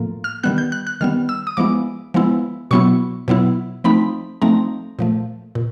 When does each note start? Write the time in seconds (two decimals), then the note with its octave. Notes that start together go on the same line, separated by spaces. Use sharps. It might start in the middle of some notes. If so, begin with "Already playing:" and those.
Already playing: A2 F3 A#3
0.24 F6
0.43 D#3 G3 B3 F#6
0.58 G6
0.72 F#6
0.87 F#6
1.01 D#3 G3 B3 F6
1.29 E6
1.47 D#6
1.57 F3 G#3 B3 E4 D6
2.14 F3 G#3 B3 E4
2.71 B2 F#3 B3 E4 C#6
3.28 B2 F#3 B3 E4
3.84 F3 A3 C4 D#4 B5
4.42 F3 A3 C4 D#4 A#5
4.99 A#2 F3 A3
5.55 A#2